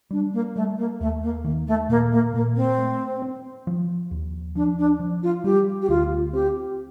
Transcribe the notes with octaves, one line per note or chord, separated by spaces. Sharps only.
G3 D4
A#3
G3 A3
A#3
D#2 A3
A#3
D#3 A#3
A3
A#2 A#3
A#3
A#2 A#3
C4
A3
C4
F3
D#2
F3 D4
D4
F3
F4
G3 G4
G4
D2 F4
C4 G4